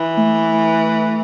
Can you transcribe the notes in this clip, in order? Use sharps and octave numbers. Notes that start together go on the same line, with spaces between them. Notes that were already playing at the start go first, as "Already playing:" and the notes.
Already playing: E3
A3